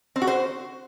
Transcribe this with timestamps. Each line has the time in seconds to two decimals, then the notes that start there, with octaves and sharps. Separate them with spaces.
0.16 C4
0.22 F#4
0.27 C5